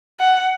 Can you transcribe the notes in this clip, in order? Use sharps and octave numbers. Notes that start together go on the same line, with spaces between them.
F#5